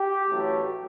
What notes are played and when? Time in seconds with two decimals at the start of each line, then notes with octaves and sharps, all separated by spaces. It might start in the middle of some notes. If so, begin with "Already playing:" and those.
Already playing: G4
0.28 A1 A2 F#3 A3